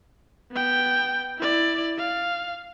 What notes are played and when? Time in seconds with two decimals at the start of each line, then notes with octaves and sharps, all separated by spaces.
0.52 B3 G5
1.38 E4 D5
1.98 F5